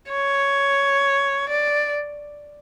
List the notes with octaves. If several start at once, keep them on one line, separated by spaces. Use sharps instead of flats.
C#5
D5